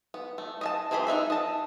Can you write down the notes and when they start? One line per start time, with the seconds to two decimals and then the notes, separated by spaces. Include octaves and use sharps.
0.14 B3
0.38 A3
0.61 D#5 E5 A5
0.91 E3 C4 G#4 C5 B5
1.07 D4 D#4 E5 B5
1.30 D#5 A5